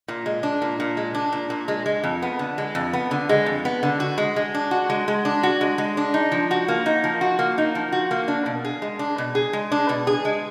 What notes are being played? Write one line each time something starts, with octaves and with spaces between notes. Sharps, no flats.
A#2
G#3
D4
A#2
A#2
G#3
D4
A#2
A#2
G#3
G#3
F2
B3
D3
G#3
F2
B3
D3
G#3
F2
B3
D3
F#4
G#3
G#3
D4
F#4
G#3
G#3
D4
F#4
G#3
G#3
D4
D#4
F3
F#4
A#3
D#4
F3
F#4
A#3
D#4
F3
F#4
A#3
D4
B2
G#4
G#3
D4
B2
G#4
G#3
D4
B2
G#4
G#3